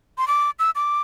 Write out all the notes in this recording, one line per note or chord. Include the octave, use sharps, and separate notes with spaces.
C6
D6
E6
D6